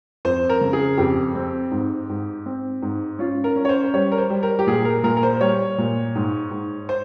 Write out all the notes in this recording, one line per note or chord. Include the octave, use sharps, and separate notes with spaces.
F2 C5
A#4
C#3
G#4
F2 G4
C4
G#2
G#2
C4
G#2
C#4 F4
A#4
C#4
C#5
C5
C5
G3 C#5
A#4
C5
G3
A#4
G4
A#2 G#4
A#4
A#2 A#4
A#4
C5
G3 C#5
A#2
G#2
G#2
C5